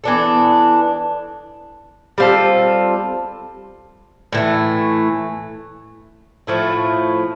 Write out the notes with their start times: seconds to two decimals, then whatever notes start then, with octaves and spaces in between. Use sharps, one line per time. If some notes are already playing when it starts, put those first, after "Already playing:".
0.04 E3 B3 D4 A4
2.18 G3 C4 F4 A4
4.32 A2 E3 A3
6.47 A2 F3 A3 E4